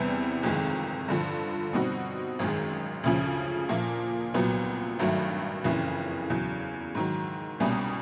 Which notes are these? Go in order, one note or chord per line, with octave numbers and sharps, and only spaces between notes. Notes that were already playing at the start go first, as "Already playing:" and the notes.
Already playing: E2 C3 E3 G3 B3
G1 F2 C3 D#3 G#3
G2 D3 F3
B2 G3 C4 D#4 F#4
G#1 F#2 D#3 G#3
D2 C#3 F3
A#2 F3 A#3
C2 A#2 F#3 B3
G#1 G2 D#3 F#3 A3
F#1 F2 C#3 E3
E2 C#3 F#3
G#2 D#3 F#3
C2 B2 G3 A#3 C#4